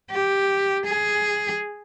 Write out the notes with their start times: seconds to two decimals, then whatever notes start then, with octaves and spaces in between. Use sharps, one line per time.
0.11 G4
0.85 G#4